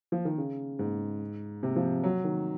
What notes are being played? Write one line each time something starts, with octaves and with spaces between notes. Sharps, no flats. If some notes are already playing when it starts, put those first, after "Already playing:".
F3
D#3
C#3
G#2
C3
F3
F#3
D#3